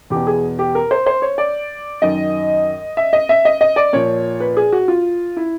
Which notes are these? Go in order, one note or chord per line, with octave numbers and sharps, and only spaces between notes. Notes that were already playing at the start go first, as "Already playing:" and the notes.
E2 B2 G4
G#4
G4
A#4
C5
C5
C#5
D5
F#2 D#3 D#5
E5
D#5
E5
D#5
D#5
D5
A#2 F3 C#5
B4
G#4
F#4
F4
E4